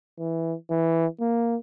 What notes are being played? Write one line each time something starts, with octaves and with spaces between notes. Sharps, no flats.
E3
E3
A#3